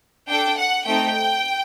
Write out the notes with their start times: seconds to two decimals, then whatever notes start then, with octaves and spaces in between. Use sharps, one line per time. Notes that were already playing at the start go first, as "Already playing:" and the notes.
0.30 D4 A4 G5
0.58 F#5
0.86 A3 C4 D#4 G5